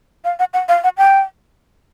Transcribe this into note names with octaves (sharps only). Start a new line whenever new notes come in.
F5
F#5
F#5
F5
F#5
G5